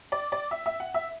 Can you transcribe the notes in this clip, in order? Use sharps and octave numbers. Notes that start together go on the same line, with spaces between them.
D5
D5
E5
E5
F#5
E5